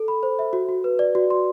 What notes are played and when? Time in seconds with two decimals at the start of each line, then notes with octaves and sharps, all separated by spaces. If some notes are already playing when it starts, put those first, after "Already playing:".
Already playing: A4
0.08 B5
0.23 C5
0.39 E5
0.53 F#4
0.69 F#4
0.84 B4
0.99 D5
1.15 F#4
1.30 C6